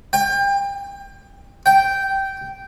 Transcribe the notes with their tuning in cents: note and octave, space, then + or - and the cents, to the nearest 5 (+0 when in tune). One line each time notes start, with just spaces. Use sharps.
G5 +30
G5 -10